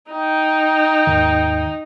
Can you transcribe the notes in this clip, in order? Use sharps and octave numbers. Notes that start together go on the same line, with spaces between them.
D#4 G5
D#2 G#2 D#3